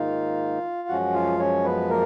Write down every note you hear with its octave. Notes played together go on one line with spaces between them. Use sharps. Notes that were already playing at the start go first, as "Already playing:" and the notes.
Already playing: G#2 D#3 A#3 D#4 F4 F5
F#2 F3 G#3 C#4 F#4 F#5
F4 F5
C#4 C#5
B3 B4
A#3 A#4